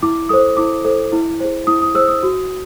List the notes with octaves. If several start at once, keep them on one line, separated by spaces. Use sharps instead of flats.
E4 D6
A4 C5 D#6
E4 D6
A4 C5
E4
G#4 C5
E4 D#6
D#6
G#4 C5 E6
D#6
F#4